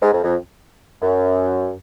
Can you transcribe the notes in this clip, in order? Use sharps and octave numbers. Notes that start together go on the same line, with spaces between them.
G#2
F2
F2
F#2